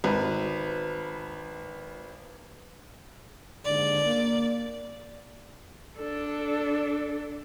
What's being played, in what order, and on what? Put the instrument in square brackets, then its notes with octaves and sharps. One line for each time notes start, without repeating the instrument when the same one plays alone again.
[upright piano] G#1 B4
[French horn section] D#2 G#2 D3 [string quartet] D5
[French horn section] A#3
[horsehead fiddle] D4 A4